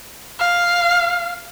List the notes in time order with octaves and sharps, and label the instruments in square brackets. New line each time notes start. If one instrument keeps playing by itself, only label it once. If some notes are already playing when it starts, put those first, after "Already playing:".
[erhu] F5